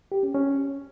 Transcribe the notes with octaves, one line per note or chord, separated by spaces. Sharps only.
G4
C#4
C#4